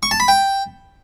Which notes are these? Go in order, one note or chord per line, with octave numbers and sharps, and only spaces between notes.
C#6
A5
B5
G5